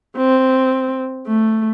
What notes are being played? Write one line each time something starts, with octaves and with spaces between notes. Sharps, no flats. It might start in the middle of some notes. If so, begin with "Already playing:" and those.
C4
A3